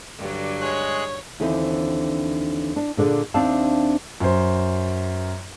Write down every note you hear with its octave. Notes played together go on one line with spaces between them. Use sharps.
G2 D3 F#3
G#3 G#4 C#5 F#6
D#2 D3 E3 C4
D4
A#2 D3 D4 G#4
D#2 C4 D4 E5 F5 A5
F#2 C5